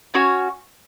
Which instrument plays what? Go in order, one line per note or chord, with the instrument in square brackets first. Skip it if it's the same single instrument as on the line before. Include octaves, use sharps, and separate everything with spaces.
[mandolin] C#4 F#4 C#5